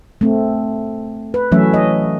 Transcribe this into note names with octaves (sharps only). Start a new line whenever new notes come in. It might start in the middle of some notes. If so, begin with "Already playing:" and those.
A3 C4
B4
E3 F#3 A3 C#4 E5
D#5